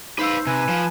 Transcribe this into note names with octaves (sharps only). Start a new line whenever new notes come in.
D#4 B4 C5 F5 E6
C3 B4 G#5
F3 E7